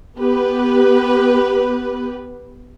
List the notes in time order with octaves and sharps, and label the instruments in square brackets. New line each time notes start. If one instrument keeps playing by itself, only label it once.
[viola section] B3 G4 B4